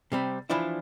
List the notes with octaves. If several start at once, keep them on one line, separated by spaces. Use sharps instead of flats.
C3 G3 C4
E3 F3 D4 E4